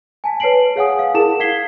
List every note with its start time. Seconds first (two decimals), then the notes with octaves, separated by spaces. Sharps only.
0.24 G#5 A5 B6
0.40 B4 C#5 A5 C7 D7 F#7
0.76 G#4 C#5 F5 F#5 G#5 D#6
0.99 F5
1.14 E4 G#4 A#4 A5 E7
1.40 E4 F5 G#6 B6 C7 G7